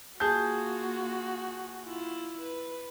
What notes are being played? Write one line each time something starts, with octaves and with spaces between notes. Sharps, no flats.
A#3 F4 F#4 G#4 A5 G6
E4 F4
B4